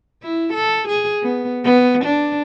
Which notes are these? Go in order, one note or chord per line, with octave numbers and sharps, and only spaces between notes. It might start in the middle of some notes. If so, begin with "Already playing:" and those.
E4
A4
G#4
B3
B3
D4